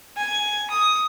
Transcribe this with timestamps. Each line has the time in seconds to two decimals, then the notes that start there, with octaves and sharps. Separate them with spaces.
0.17 G#5
0.70 D#6